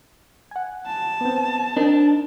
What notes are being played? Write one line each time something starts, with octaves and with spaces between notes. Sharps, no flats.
F#5 G#5
A5
B3 C4
C4 D4 D#4 A#4